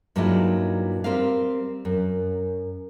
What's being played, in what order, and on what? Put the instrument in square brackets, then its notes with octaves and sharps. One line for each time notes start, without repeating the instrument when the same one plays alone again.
[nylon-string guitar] G2 A#2 F#3 G#3 D#4 E4
G3 C4 A#4 F5
F#2